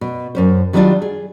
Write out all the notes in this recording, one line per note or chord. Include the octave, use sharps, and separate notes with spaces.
B2
F#2 C#4 C5
D#3 F#3 G3 B3 D4 F4
G#4